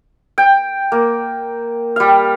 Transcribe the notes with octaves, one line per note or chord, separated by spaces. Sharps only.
G5
A#3
G3 F5